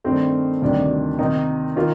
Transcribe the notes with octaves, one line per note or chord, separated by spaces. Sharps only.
G2 D#3 A3 C4
D2 C3 D#3 G3 D4
C3 D#3 A#3 D#4
D#3 A#3 F4